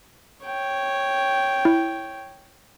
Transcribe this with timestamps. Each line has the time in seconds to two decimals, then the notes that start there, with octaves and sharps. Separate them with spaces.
0.45 C#5 G5
1.65 E4